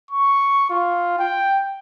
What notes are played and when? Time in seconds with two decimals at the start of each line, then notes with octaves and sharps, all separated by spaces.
0.11 C#6
0.70 F4
1.19 G5